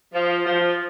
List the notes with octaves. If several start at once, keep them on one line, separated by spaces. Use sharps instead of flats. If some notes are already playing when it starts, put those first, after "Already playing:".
F3
F3